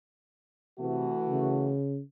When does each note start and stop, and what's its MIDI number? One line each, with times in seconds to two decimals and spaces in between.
0.79 1.15 48
0.79 1.75 52
0.79 1.75 57
0.79 1.75 66
1.28 2.00 49